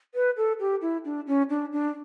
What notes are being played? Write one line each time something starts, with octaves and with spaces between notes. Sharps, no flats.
B4
A4
G4
E4
D4
C#4
D4
D4